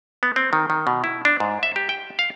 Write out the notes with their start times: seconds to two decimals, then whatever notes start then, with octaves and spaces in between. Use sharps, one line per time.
0.23 B3
0.36 C4
0.53 D#3
0.70 D#3
0.87 B2
1.04 E4
1.25 D4
1.40 G#2
1.63 E5
1.76 G4
1.89 G5
2.19 F5